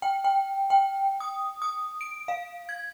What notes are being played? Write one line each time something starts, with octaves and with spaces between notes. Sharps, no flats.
G5
G5
G5
D#6
D#6
D7
F5
G#6